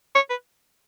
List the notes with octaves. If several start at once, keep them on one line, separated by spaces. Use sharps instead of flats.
C#5
B4